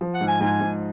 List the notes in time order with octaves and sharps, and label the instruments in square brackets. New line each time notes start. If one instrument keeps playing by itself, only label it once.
[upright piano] F3
[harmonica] F#5
[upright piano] G#2
[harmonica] G#5
[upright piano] G#2 [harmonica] G#5
[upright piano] G#2